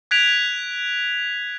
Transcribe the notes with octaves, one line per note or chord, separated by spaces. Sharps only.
F#6 G#6 B6 D7 F7